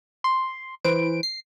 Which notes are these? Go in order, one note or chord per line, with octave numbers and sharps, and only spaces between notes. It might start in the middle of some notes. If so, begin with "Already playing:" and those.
C6
E3 B4 C5 D7
C7